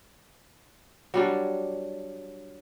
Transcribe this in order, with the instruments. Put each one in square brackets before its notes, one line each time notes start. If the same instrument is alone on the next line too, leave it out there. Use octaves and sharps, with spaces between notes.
[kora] F#3 G3 D4